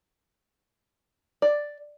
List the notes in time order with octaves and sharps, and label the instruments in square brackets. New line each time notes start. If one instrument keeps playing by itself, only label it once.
[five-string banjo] D5